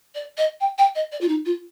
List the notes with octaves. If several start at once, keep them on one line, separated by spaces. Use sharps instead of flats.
D5
D#5
G5
G5
D#5
D5
F4
D#4
F4